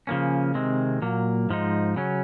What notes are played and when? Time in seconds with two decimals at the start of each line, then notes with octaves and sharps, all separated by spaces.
0.07 C#3 F3 A#3 C#4
0.54 C3 D#3 G#3 C4
1.02 A#2 F#3 A#3
1.50 G#2 F3 G#3 D#4
1.96 C#3 F#3 C#4